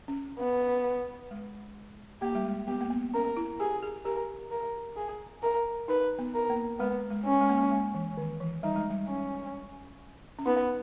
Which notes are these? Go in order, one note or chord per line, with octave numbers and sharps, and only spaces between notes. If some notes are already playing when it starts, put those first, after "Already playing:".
C#4
B3
G#3
A#3 G4
G3
G#3
B3 G4
A#3
B3
C#4 A#4
E4
G4 G#4
G#4
G4 A#4
A#4
G#4
A#4
D#4 B4
B3
A#4
A#3
G#3 B3
G#3
C#4
G#3
A#3
G#3
G#3
E3
D#3
E3
G3 D#4
G#3
G3
C#4
C#4
B3 D#4